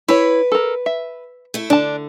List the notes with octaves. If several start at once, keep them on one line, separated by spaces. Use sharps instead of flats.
E4 B4 C#5
A4 A#4
E5
A3 E4
D3 D4 A5